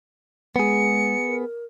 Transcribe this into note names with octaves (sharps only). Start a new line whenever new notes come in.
G#3 B3 G#4 C#7
A#4